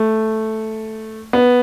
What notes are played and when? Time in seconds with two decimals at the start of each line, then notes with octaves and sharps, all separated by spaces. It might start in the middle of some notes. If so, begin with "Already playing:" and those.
Already playing: A3
1.33 B3